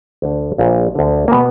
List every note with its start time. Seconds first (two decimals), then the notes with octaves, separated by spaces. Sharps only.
0.22 D2 D3
0.58 A#1 A#2
0.95 D2 D3
1.28 A#3
1.32 B2 B3